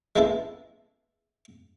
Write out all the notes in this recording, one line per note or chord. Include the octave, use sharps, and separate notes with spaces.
G#3 A#3 B3 E4 A4